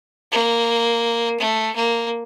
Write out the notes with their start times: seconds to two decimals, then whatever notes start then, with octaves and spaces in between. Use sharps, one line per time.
0.32 A#3
1.40 A3
1.76 A#3